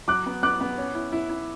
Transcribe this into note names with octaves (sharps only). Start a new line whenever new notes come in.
F#3 D6 F#6
B3
B3 D6 F#6
B3
C#4
E4
E4
E4